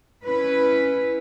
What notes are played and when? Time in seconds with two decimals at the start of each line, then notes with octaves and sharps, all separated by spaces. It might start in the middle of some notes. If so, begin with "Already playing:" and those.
0.22 C#4 E4 B4